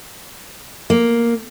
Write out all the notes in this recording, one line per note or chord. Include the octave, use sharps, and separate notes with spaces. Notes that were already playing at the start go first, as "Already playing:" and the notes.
A#3